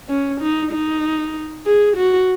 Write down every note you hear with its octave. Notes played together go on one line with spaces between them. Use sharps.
C#4
D#4
D#4
G#4
F#4